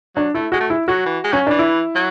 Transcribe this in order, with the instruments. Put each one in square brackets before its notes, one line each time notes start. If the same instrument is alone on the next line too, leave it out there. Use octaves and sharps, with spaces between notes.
[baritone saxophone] F#3 [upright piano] D4
[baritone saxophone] A3 [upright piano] E4
[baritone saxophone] G#3 [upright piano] F#4
[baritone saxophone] A3
[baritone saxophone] G#3 [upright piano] E4
[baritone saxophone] F#3 [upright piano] F#4
[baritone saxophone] E3
G#3
[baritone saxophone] F#3 [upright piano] C#4
[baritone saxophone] E3 [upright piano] D4
[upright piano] E4
[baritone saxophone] F#3